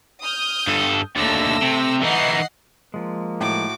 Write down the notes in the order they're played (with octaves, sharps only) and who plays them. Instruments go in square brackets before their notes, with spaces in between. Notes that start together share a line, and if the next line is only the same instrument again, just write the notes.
[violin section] D#6 F6 G6
[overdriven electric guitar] G2 A4
[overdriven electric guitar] D#2 D3 [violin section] A3 E6 A#6
[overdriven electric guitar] C3
[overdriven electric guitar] E3 D#4 [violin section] D#5 F#5 C7
[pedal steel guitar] F3 G#3 [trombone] A#3
[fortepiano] A2 [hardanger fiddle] F#4 D6